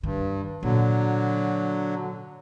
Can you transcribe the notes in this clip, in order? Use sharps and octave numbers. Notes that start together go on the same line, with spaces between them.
G2 D#3
A#2 D3 F#3